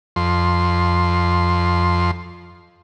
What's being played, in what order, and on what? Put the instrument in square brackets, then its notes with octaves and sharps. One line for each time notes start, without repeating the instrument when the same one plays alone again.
[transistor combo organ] F2 C6